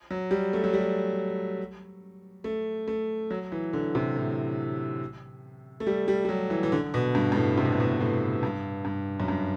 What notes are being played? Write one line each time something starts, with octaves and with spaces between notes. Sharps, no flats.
F#3
G3
A3
F#3
G3
A3
A3
F#3
E3
D3
C3
A2
A3
G3
G3
G3
F#3
E3
E3
D3
B2
G2
G2
A2
C3
B2
A2
B2
A2
G2
G2
F#2
G2